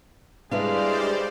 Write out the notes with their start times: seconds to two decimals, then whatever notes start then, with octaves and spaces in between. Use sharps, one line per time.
0.51 G3 G#3 D4 E4 B4 C5 D5 F5